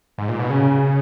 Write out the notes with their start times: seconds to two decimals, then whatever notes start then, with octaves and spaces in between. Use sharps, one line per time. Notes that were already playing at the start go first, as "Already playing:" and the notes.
0.18 G#2
0.29 A#2
0.39 B2
0.50 C#3